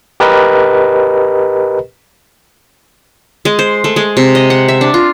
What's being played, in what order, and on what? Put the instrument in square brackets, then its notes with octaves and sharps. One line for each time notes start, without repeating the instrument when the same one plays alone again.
[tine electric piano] G4 A#4 B4 D#5
[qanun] G#3
C5
A3
G#3
C3
D#5
F#5
E5
D4
F4